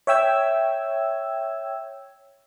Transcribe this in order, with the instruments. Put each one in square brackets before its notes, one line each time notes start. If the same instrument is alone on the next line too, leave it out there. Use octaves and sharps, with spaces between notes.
[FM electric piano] C#5 E5 G5 E6 G#6